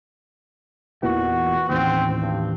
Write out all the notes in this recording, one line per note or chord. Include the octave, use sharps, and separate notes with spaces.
E2 A#2 E3 F#4
A1 D#2 C4
G2